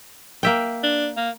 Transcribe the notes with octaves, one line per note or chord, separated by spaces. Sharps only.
A#3 E5 G5
D4
A#3